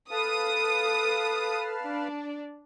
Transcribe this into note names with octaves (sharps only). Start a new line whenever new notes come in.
A4 B4 F5 A5 D#6
D4